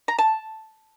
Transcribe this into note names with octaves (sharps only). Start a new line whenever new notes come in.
A#5
A5